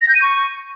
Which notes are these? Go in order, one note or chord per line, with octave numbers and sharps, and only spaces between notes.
A#6
G6
D#7
C#6